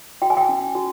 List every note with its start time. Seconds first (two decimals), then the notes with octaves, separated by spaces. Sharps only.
0.22 F#4 G5
0.30 G#5
0.37 G5
0.49 C#4
0.75 F#4